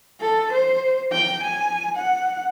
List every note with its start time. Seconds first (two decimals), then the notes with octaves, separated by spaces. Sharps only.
0.21 A4
0.52 C5
1.12 G5
1.43 G#5
1.96 F#5